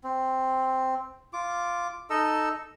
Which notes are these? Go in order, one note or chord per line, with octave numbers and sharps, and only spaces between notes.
C4
F4 D6
D#4 A4 D#5 E6